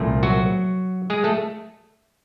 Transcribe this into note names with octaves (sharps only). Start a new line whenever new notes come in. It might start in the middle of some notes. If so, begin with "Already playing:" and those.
Already playing: C2 A#2 F3 A3
F#3 F#4
G#3 G#4
A3 A4